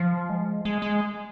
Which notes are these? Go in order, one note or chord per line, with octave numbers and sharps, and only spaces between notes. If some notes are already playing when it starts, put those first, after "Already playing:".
Already playing: F3
G#3
G#3
G#3